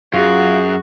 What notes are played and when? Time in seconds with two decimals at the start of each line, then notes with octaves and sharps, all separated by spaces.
0.14 F#2 F4 F#4 G#4